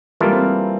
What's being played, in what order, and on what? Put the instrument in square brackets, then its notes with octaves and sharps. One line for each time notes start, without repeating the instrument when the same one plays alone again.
[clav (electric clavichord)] E3 A#3 F4 A4 [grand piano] G3
[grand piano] C4